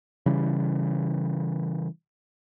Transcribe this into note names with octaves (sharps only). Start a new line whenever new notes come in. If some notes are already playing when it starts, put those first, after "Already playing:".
C#3 E3 G3